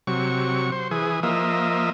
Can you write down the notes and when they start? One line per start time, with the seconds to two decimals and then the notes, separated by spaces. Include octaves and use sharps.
0.07 C3 F#3 C#6
0.72 C5
0.91 E3 G#4
1.23 F3 A#3 D#5 E5